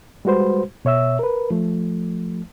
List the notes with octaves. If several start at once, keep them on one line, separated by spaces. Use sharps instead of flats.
G3 G#3 F#4 B4 C5
B2 C#5 E5 E6
A#4 B4
F3 A3